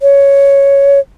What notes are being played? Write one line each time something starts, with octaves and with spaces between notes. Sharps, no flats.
C#5